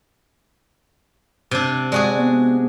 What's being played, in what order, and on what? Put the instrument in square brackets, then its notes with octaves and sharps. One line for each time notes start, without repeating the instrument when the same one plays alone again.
[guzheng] C3 D4
[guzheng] G#3 F#4 G#4 [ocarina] D5
[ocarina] B3